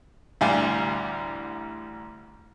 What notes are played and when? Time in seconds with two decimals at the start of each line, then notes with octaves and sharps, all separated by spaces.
0.41 A1 D2 G3 F5 G#5